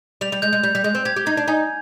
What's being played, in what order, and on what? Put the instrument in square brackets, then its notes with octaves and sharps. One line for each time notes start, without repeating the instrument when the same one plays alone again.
[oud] G3 [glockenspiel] F7
[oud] G3
[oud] G#3 [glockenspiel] G6
[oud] G#3
[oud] G3 [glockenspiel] G6
[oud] G3
[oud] G#3 [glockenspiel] G6
[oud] C4
[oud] G4 [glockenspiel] G#6
[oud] G4
[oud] D#4 [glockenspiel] G#6
[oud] D4
[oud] D#4 [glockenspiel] G#5